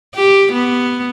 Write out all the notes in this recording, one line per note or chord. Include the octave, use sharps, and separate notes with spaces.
G4
B3